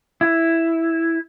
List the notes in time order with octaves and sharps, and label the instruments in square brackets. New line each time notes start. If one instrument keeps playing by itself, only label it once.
[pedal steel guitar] E4